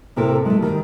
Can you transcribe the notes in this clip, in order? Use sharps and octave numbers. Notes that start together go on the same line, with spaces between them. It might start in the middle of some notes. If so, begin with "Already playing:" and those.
A2 C3 E4 A4 A#4 G5
G#3 A3
D#3 G3